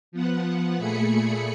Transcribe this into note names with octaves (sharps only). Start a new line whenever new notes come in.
F3 B3 F#5
A#2 A3 G#4 B5 C#7